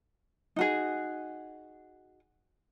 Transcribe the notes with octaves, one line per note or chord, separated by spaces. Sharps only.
D#4 F#4 G#4